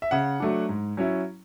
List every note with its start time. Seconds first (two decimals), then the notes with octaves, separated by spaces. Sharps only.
0.02 E5
0.11 C#3 F#5
0.40 F#3 A3 D4
0.69 G#2
0.97 F#3 C#4 E4